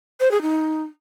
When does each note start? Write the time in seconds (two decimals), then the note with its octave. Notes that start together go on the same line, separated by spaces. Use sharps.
0.20 C5
0.31 G#4
0.42 D#4